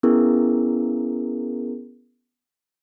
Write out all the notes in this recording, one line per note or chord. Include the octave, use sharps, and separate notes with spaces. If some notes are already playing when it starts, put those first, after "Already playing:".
B3 C#4 E4 G#4 A#4